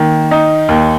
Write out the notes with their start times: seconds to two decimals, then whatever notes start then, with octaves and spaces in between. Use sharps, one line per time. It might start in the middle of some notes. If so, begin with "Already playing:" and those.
Already playing: D#3 A#3
0.31 D#4
0.68 D#2